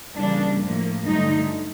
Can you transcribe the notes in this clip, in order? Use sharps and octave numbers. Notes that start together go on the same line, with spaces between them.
C#3 E3 G3 A#3 D4
A2 F3 A#3
G2 D3 F#3 A3 D#4